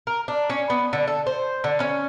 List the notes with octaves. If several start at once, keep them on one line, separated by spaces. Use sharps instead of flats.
A#4
D4
C#4
B3
D3
A4
C5
D3
C#4